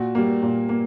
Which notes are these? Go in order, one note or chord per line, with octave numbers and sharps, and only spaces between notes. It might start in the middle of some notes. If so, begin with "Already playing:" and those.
Already playing: A#2 F#4
G3 A#3
A#2
A#3